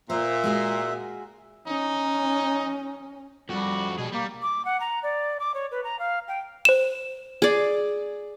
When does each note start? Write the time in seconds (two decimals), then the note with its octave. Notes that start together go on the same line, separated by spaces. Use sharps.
0.10 A#2 C5 E5
0.44 G#3 F#4 G#4
1.67 C#4 D#4
3.49 F2 G3 F#4
3.99 B2 G3 G#4
4.13 G3 A#3
4.42 D6
4.65 F#5
4.80 A#5
5.03 D5
5.40 D6
5.54 C#5
5.71 B4
5.84 A#5
5.99 F5
6.28 G5
6.65 C5 E7
7.42 G#4 D5